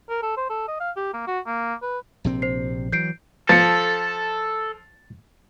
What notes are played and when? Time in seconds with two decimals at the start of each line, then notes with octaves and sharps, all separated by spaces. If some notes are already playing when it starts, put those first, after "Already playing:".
0.09 A#4
0.22 A4
0.37 C5
0.50 A4
0.68 D#5
0.80 F5
0.96 G4
1.13 A#3
1.27 F#4
1.46 A#3
1.82 B4
2.24 A#1 C3 C4
2.42 C5 C7
2.92 E3 F#3 G6 C7 D7
3.49 F3 A4 A6 C#7